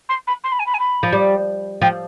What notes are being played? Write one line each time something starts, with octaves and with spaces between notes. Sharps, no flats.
C6
B5
C6
B5
G#5
B5
G#5
B5
F3
G3
F3 G5